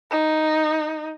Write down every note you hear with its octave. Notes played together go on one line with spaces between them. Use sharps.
D#4